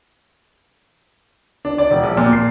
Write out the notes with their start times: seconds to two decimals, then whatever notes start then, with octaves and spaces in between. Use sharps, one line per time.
1.65 D4
1.78 D5
1.90 E1
2.03 A#1
2.17 A#2
2.33 C7